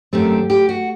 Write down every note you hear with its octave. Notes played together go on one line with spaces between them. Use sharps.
F#2 D#3 A3 C4 G4
G4
F#4